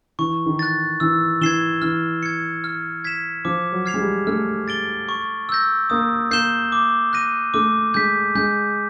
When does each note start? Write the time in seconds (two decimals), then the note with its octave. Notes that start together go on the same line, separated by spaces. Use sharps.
0.19 E3 C#6
0.46 D#3
0.59 F#6 A6
1.00 E3 E6
1.41 E3 G#6 C7 E7 G7
1.82 E3 F6
2.23 G#6 C#7
2.64 F6
3.04 G#6 B6 E7
3.45 F3 D6
3.72 F#3
3.86 F6 G#6 C7 F7
3.94 G#3
4.00 G3
4.27 A3 F6
4.68 A6 D7 G7
5.09 C#6
5.49 E6 G6 A#6
5.90 A#3 D#6
6.31 A#3 G6 C7 E7 G7
6.72 D6
7.13 F#6 A#6 D#7
7.54 A3 D6
7.94 G#3 G6 B6
8.35 G#3 G6